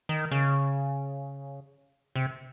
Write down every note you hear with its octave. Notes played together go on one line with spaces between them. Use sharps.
D#3
C#3
C3